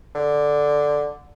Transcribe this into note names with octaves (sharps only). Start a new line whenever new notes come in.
D3